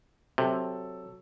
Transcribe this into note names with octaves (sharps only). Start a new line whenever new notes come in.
C3 F#3 A4